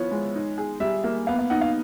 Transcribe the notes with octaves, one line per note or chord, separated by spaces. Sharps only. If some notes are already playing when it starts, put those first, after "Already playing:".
Already playing: F3 B3 E4 C#5
G#3
D#4
G#4
G3 E5
A#3
B3 F5
F5
D#4 F#5
F5